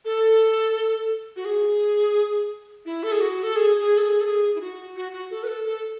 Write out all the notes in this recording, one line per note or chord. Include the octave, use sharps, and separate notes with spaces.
A4
F#4
G#4
E4
A4
G#4
F#4
A4
G#4
G#4
A4
G#4
A4
G#4
E4
F#4
F#4
F#4
A4
B4
A4
A4